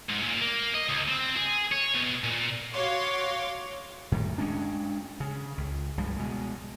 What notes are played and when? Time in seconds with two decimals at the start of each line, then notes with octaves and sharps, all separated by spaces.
0.09 G#2
0.23 A#2
0.41 A#3
0.74 D#5
0.89 C#2
1.09 C4
1.36 G#4
1.72 C#5
1.95 B2
2.24 A#2
2.73 F#4 C#5 F5 C6 D6
4.12 F#2 A2 D#3
4.38 G#3 C#4 D4
5.20 C#3
5.58 C#2
5.98 C#2 G2 F3 G#3
6.17 B2 G#3